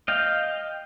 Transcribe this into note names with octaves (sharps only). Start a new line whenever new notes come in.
D#5 F5 G5